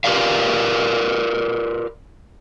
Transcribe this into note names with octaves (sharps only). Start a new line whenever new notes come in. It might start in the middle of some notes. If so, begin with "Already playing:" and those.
F4 G4 A#4 B4 D5 F5